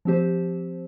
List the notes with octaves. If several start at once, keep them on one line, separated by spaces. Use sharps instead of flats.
F3 C4 G4 C5